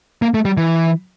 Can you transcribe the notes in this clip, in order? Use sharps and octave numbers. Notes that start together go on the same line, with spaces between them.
A#3
A3
G3
E3